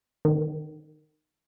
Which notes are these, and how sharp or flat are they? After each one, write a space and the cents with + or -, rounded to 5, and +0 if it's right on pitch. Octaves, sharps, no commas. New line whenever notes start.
D#3 -15